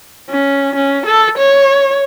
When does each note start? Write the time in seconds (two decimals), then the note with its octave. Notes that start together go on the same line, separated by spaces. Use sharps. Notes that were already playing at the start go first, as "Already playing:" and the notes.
0.30 C#4
0.75 C#4
1.06 A4
1.38 C#5